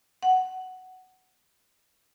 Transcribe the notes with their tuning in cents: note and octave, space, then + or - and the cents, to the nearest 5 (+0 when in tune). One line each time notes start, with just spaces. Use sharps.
F#5 +10